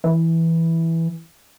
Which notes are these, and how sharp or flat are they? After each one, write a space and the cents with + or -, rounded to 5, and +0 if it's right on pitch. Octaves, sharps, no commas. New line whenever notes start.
E3 -5